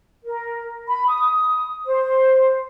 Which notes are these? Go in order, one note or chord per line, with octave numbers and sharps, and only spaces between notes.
A#4
B5
D#6
C5